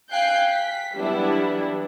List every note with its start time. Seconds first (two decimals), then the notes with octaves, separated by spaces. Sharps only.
0.10 F5 G5 G#5 F#6 G6 C7
0.47 B6
0.94 E3 F#3 G3 B3 D4 E4